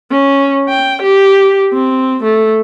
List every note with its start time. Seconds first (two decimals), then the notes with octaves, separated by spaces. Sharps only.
0.11 C#4
0.69 G5
1.02 G4
1.73 C4
2.23 A3